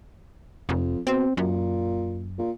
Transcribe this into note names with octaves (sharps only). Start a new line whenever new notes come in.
F1 F2
B2 C4
F#2 A#2
A#2